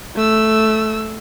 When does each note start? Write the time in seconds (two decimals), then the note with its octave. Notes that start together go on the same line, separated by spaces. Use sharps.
0.15 A3 E6